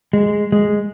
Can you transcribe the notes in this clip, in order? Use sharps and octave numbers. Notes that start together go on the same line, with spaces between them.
G#3
G#3